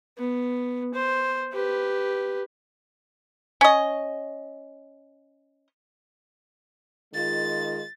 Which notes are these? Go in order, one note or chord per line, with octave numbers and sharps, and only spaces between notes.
B3
C5
G4 B4
C#4 D#5
D#3 G#3 F4 A6